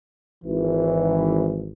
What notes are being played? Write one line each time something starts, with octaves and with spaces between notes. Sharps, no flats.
G#1 E3